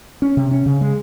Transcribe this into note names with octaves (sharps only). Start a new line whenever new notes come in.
C#4
C3
C#4
C#3
G#3